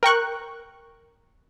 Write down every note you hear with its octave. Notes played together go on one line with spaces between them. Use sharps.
A#4 G5 C#6 F#6